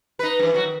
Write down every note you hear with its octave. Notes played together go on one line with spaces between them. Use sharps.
D#4 B4
G2 E3
F2 F#3 F#4
D#3